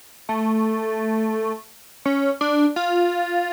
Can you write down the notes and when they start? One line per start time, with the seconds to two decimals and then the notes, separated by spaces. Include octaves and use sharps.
0.29 A3
2.05 C#4
2.41 D4
2.76 F4